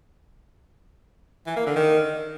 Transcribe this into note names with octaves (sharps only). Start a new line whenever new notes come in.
E3
A#3
D3
D#3